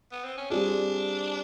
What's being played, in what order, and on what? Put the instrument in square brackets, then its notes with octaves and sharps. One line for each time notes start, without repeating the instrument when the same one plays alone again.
[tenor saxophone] B3
C4
C#4
[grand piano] G3 C4 F4 G#4 [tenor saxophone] D4